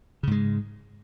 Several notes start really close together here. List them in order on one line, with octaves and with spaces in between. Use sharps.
C#3 G#2 G#3